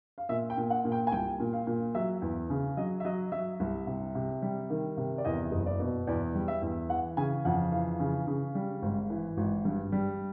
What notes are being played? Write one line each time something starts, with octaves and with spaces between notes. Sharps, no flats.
F5
A#2 E5
G5
A#2
F#5
A#2
G5
G#5
C2 G5
A#2
F5
A#2
F#3 E5
E2
C#3
F#3 D#5
E5
F#3 D#5
F#3 E5
C2
C3
C3
G3
D#3
C3
D5
E2 D#5
F#1
D5
B2
E2 D5
G3
E5
E2
E3 F#5
C#3 G#5
F2 F#5
E3 F5
C#3
C#3
G3
G#1
E3
G#1
G2
G3